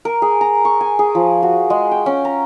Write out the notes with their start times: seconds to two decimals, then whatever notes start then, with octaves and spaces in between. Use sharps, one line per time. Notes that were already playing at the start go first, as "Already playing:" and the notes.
0.05 A#4
0.22 G#4
0.41 A#5
0.65 C#6
0.81 G#5
0.99 G#4
1.15 F3
1.43 F#4
1.70 G#3
1.91 G5
2.06 C#4
2.25 A#5